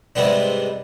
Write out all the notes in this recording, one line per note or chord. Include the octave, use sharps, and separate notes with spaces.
G#2 C3 G3 B3 D4